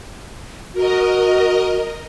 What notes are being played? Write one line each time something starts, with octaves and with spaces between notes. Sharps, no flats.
F#4 A#4 D#5